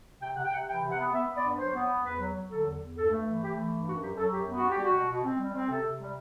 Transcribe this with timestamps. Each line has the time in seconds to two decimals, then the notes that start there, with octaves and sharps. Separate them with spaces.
0.21 C3 G5
0.36 C3 F#5
0.44 G5
0.51 C3 F#5
0.67 E3 G5
0.82 C3
0.90 F#5
0.97 B3
1.12 B3 E5
1.28 B3
1.35 D5
1.43 G2
1.58 F#3 C5
1.74 B3
1.89 G2
2.03 E2 B4
2.18 F#3
2.34 F#3
2.49 D3 A4
2.65 E2
2.80 E2
2.95 G2 A4
3.10 A3
3.25 E3
3.41 A3 G4
3.56 E3
3.71 G2
3.86 F#2 F#4
4.01 F#3 G4
4.16 F#3 A4
4.31 F#2 G4
4.47 B3
4.54 F#4
4.63 D4
4.69 G4
4.78 G3 F#4
4.93 B2
5.08 B2
5.24 C4
5.38 G3
5.53 C4
5.68 C3 A4
5.84 C3
5.99 G3